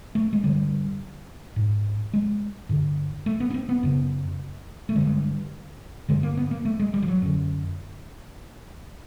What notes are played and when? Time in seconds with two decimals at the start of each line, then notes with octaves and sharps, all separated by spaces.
0.15 A3
0.33 G#3
0.44 G2 D3 G3
1.56 G#2
2.14 G#3
2.69 G2 D3
3.26 A3
3.40 B3
3.50 C#4
3.54 C4
3.69 B3
3.83 F#2 C#3
4.89 A3
4.95 G2 D3 G#3
6.09 G2 D3 G#3
6.23 A#3
6.37 B3
6.51 A#3
6.65 A3
6.79 G#3
6.94 G3
7.03 F3
7.08 F#3
7.22 F#2 D3